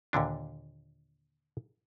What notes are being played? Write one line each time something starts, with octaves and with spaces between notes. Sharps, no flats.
D#2 A#2 D3 D4